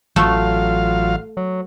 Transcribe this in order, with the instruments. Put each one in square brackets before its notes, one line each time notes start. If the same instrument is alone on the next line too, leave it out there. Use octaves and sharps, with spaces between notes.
[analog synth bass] A1 [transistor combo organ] F#3 F4 F5 [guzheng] A3
[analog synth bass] F#3